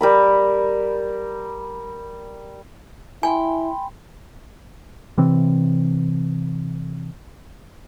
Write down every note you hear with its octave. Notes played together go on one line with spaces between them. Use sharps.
G3 A#4 B5
E4 G5 G#5 B5 C6
C3 E3 C4